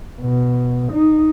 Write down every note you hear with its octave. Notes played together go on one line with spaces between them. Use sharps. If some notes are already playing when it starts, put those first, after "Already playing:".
B2
D#4